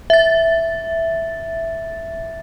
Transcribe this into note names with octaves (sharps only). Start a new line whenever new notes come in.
E5 A6